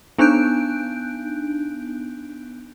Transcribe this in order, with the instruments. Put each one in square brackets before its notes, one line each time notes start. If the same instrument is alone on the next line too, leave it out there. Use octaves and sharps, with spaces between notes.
[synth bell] B3 D4 D#4 F#6 G6 D7